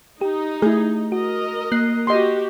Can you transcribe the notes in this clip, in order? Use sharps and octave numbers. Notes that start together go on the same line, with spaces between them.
D#4 G4
A3 E4 G#4
F#4 A#4 D#5
A#3 F#6 C7
F#4 G4 D#5 C6